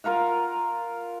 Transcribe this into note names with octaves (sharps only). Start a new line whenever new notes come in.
F4 A#4 F5 F#5